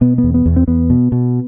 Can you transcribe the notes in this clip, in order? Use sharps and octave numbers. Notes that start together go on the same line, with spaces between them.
B2 B3
B3
E2
B3
E2
C4
E2 B3
B2
B2